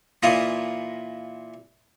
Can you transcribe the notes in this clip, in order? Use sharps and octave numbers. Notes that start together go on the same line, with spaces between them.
A#2 E3 E4 F4 D#5 A#5